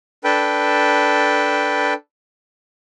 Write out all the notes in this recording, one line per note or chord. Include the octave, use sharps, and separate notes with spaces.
D4 A4 B4 G5